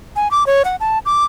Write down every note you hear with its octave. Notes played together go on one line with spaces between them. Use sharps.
G#5
D6
C#5
F#5
A5
D6